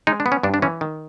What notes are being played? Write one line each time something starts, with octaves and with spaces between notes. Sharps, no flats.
G#3 D#4
D4
B3
C#4
G2 D4
D4
E3 C#4
D#3